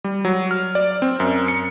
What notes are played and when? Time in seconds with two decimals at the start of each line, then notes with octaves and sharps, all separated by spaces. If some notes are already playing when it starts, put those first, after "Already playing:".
0.04 G3
0.25 F#3
0.51 F6
0.75 D5
1.02 C4
1.20 F#2
1.48 C#7